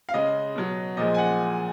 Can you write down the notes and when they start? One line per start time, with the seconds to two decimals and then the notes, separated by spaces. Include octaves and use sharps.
0.09 F5
0.14 C#3 G#3 D#5
0.55 B2 F#3
0.97 A#2 F3 G#3 D#5
1.14 G#5
1.18 F#5